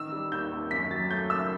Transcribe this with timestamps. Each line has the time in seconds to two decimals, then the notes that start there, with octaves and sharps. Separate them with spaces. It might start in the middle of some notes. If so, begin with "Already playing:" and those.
Already playing: A1 D#3 E6
0.12 G3
0.32 D#2 G6
0.51 D#2
0.71 F#2 B6
0.91 F#3 A6
1.10 A3 G6
1.30 F#1 E6